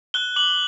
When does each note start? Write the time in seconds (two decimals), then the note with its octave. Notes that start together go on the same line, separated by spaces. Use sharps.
0.14 F#6 G7
0.36 D6 F#7